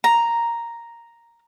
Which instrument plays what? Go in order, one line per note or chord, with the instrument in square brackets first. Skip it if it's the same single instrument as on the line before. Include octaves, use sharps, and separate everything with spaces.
[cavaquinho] A#5